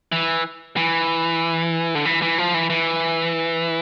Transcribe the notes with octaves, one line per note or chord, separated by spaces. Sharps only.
E3
E3
D3
E3
E3
F3
E3
E3